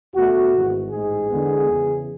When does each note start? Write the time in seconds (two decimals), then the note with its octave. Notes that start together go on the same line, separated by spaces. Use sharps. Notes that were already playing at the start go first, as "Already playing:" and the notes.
0.14 E2 B2 A3 F#4
0.52 G#1 G#2 E3
0.91 A1 G#2 G#3 G#4
1.30 E2 D3 G#3 B3
1.68 E2 C#3 E3